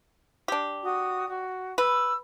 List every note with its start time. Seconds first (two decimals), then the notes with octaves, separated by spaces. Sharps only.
0.48 D4 G4
0.83 F#4 D#6
1.28 F#4
1.78 B4 E6